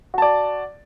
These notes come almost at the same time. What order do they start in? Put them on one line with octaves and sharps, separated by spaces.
F#4 A5 D5